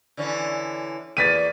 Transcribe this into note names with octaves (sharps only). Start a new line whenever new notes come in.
D3 E3 C#4
E2 A#3 A6 B6 D#7